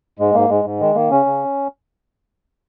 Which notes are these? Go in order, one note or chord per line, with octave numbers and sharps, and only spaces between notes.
G#2 G#3
G#2 A#3
G#2 G#3
G#2
D#3 G#3
D#3 A#3
C#3 C#4
C#3